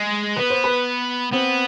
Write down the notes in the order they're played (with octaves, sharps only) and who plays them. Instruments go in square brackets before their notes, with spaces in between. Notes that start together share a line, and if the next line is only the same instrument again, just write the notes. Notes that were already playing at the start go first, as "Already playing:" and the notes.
Already playing: [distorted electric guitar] G#3
[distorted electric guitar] B3 [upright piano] B4
[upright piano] C5
B4
[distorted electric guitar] B3 [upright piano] C4